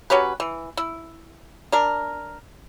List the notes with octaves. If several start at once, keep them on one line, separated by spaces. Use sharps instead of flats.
F#3 C#4 G4 B4
E3
E4
D4 A#4